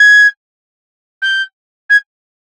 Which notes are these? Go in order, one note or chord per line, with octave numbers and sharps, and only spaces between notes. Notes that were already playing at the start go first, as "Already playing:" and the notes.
Already playing: G#6
G6
G#6